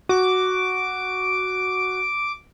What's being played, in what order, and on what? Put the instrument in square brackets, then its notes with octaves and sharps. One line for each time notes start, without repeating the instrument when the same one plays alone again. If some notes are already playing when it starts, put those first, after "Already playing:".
[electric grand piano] F#4 [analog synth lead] D6